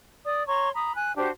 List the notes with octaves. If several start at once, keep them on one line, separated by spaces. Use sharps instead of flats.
D5 D#6
C#5 A#5 C6 C#6
A#5 B5 D#6
G#5 F#6
D4 F#4 G4 C5